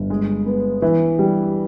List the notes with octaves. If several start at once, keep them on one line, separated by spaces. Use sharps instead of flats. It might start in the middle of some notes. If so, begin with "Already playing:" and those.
Already playing: G1
G#3
B3
E3
G3